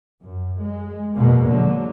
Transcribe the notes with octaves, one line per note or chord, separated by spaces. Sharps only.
F#2
G#3
E2 B2 G#3 A#3
D3 F#3